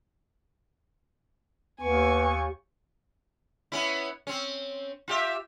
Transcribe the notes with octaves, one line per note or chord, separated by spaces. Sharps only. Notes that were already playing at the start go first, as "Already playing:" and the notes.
D#2 B3 G#5 C#6
B3 C#4 E4
C4 C#4
F4 G4 E5